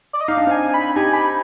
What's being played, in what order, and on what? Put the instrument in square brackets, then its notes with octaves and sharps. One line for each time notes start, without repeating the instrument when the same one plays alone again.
[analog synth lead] D5
D#5
[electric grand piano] D#4 [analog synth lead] F5
[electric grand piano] D4
[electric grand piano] C4 D#4 [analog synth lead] G#5
[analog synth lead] B5
[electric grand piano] D#4 G4 [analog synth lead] G#5
[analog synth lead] B5